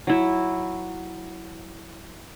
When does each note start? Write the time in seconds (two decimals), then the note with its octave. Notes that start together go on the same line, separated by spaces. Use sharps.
0.07 F#3 E4